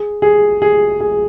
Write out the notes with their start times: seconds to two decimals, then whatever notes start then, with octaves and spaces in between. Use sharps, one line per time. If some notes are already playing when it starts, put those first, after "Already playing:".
Already playing: G#4
0.22 G#4
0.62 G#4
1.00 G#4